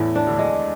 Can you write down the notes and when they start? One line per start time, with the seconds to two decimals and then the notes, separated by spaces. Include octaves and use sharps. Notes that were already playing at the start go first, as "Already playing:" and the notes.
Already playing: E2 A2 E3
0.15 D4
0.27 D2 D3
0.39 G#3